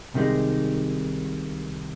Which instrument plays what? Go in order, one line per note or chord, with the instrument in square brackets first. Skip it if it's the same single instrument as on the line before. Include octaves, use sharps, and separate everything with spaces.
[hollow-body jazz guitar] C2 C3 D#3 G#3 D#4